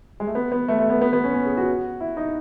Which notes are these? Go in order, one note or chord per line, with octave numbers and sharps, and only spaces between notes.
G#3
A3
B3
B3
A3
A3
B3
B3
B3
C#4
C#4
G#4
F#4
E4
D#4